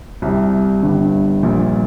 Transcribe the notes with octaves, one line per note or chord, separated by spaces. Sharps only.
C2 C3 G3
G1 G2 G3
A#1 A#2 G3